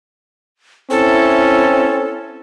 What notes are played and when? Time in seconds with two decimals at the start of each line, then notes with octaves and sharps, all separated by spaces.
0.91 C4 C#4 E4 A4